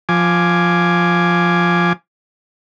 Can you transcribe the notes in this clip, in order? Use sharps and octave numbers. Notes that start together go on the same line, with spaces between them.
F3 G#5 D6